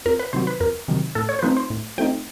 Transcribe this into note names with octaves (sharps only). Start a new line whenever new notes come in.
F2 A#4
B4
C3 D#3 F#3 C5
B4
F2 A#4
C3 D#3 F#3
A2 A4
C#5
C5
F3 A3 C4 D#4 B4
C5
A2
F3 A3 C4 D#4 G5